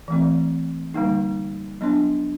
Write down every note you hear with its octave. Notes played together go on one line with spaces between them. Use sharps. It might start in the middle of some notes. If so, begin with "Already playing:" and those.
E3 A3 C4
D3 G3 A#3 D#4
F#3 B3 D4